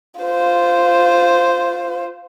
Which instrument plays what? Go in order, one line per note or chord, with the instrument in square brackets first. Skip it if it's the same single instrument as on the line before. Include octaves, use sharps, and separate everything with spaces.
[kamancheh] F4 C5